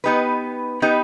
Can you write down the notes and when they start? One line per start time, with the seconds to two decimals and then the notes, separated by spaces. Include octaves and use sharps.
0.04 B3 D#4 G4 B4
0.82 B3 D#4 G4 B4